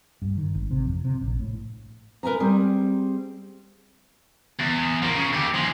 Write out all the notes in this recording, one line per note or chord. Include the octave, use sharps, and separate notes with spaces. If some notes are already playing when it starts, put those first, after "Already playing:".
G2
D#3
G#1
C3
F2
C3
A#1
A2
A#4 B4 G#5 A#5
G3 C4 G#4
E2
F3 A#3
C#3
D#2 G4
F3 G#3